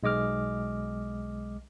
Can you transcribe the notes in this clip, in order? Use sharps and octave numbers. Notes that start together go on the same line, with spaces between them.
B1 G#3 D#5 D6 F6